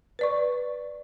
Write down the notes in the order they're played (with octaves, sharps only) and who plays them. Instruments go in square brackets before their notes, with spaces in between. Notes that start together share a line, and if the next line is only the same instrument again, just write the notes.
[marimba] B4 D5 C#6